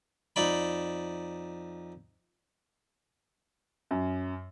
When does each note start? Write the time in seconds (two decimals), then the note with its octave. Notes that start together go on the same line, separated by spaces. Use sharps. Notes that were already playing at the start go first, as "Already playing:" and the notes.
0.36 F2 D#4 D5 B5
3.91 F#2